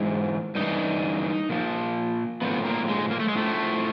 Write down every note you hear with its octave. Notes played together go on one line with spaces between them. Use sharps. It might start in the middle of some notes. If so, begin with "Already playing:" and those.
Already playing: G#2 E3
G2 E3 D#4
A#2 F3
A2 F3 B3
A#3
G#3
A#3
A3
G#3
A2 F3 A3